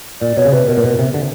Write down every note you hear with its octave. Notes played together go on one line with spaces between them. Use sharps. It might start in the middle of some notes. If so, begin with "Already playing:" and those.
A#2 D5
B2 C#5
C#3
C3 B4
B2 A#4
A#2
B2
C3
D3